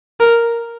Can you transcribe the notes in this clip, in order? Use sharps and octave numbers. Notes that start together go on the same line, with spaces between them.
A#4